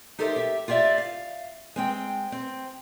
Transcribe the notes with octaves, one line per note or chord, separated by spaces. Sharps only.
D#4 G4 A4 A#4 C5 E5
G4 E5
F4 G4 D5 E5
F5
G#3 C4 G5
C4